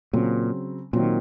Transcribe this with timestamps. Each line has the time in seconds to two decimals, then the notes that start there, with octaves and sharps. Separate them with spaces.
0.13 A#2 C#3 F#3 C4
0.93 A#2 D#3 F#3 C4